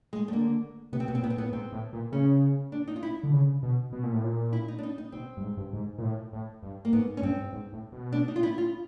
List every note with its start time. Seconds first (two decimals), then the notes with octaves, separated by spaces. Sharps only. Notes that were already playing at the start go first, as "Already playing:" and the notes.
0.13 G#3
0.28 A3
0.32 D3 A#3
0.92 C3 B3
1.00 C4
1.08 B2 B3
1.15 C4
1.22 A#2 B3
1.30 C4
1.38 A2 B3
1.52 G#2 C4
1.73 A2
1.93 A#2
2.12 C#3 C#4
2.72 D4
2.88 D#4
2.96 F4
3.03 E4
3.23 D3
3.33 C#3
3.63 B2
3.93 B2
4.04 A#2
4.13 A2
4.23 A#2
4.53 E4
4.68 D#4
4.78 D4
4.83 D#4
4.98 D#4
5.12 B2 C4
5.37 G2
5.43 G#2
5.57 G2
5.73 G#2
5.98 A#2
6.03 A2
6.33 A2
6.63 G2
6.85 A#3
6.93 G#2 B3
7.17 C#4
7.22 G2 C4
7.53 G#2
7.73 A2
7.92 B2
8.12 D4
8.28 D#4
8.36 F4
8.43 E4
8.58 F4